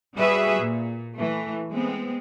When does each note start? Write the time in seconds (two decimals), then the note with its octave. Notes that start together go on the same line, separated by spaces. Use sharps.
0.17 G3 F#4 G#4 B4 E5
0.60 A#2
1.15 E3 A3
1.73 G#3 B3 C4